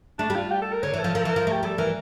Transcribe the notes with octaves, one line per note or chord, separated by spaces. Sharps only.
A3 D4
G3
F4
G4
A4
A#4
D3 C#5
E3
A4
F3
F3 A#4
A4
E3
A#4
F3
A3 G4
G3 A4
E3 A#4